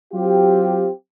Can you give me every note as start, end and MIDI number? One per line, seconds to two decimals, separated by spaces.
0.13 0.89 54
0.13 0.89 60
0.13 0.89 65
0.13 0.89 67